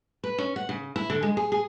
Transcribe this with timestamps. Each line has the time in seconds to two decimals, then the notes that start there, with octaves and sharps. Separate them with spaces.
0.24 B4
0.38 C#4
0.56 F#5
0.69 C#3
0.96 E4
1.10 D3
1.23 G#3
1.37 G#4
1.52 G#4